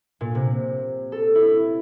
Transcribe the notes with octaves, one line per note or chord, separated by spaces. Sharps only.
A#2
C3
A4
E4